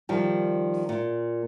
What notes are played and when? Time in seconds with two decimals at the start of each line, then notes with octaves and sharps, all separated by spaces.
0.09 D#3 F3 G3
0.89 A#2